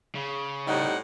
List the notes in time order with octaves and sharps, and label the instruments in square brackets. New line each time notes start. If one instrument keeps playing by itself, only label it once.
[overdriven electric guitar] C#3
[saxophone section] A2 C3 G3 [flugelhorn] D#4 [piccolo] F#5